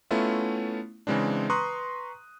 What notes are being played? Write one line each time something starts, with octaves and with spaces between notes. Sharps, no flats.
A3 B3 C#4 E4 F4
C#3 E3 G#3 C4 D4
B4 A#5 C6 C#6 D#6 F#6